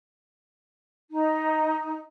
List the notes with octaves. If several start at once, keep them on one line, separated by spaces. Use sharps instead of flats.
D#4